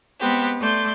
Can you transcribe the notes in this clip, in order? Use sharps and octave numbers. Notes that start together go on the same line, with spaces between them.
G#3 B3 C4 G4
A3 D5 C6 G6